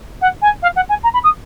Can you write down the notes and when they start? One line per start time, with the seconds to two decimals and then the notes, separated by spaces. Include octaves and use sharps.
0.22 F#5
0.42 G#5
0.63 F5
0.76 F#5
0.89 G#5
1.03 A#5
1.14 B5
1.24 D#6